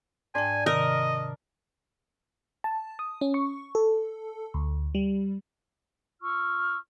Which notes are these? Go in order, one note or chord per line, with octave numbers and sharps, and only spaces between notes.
G#2 D4 G5 G#5
C3 D#3 A#4 D#5
A5
D#6
C#4
C#6
A4
D2
G3
F4 C#6 E6 F6